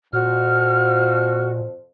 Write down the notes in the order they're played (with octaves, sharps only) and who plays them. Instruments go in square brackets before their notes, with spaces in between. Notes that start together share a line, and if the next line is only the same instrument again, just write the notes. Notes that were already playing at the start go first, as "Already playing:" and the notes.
[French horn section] F2 C5 [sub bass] A#2 [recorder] F#4 [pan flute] F6